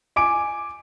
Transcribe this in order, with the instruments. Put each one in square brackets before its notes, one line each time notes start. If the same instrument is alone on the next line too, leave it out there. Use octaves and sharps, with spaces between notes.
[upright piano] G#5 D6 D7